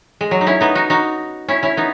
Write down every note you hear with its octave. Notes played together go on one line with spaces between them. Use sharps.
G#3
F#3
D#4
C#4 E4
B3 D#4
D#4 F#4
D#4 F#4
C#4 E4
C#4 E4
B3 D#4